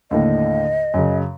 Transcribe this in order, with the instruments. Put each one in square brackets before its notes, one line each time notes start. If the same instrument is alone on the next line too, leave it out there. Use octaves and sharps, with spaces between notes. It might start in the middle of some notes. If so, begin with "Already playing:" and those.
[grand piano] D#2 A2 D3 [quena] D#5
[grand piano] F#2 C#3